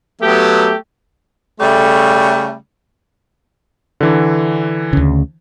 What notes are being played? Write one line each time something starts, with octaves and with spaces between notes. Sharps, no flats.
F#3 A3 B3 G4
C#3 G3 A3
D3 E3
D2 C#3